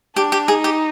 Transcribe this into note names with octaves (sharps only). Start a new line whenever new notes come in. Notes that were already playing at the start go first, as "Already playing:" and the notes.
D4 G4
G4
D#4 G#4
G4